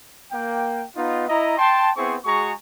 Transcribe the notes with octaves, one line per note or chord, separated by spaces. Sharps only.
A#3 G5
B3 D#4 F4
E4 D#5 A#5
G5 A5 C6
B3 C4 E4 G#4 C5 C#6
G#3 F#4 G#4 A#5 C#6